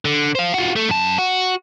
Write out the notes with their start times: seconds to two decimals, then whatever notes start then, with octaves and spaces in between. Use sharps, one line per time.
0.05 D3
0.35 C5 F5
0.54 F4 F#4
0.76 A3
0.89 F#2 A5
1.18 F#4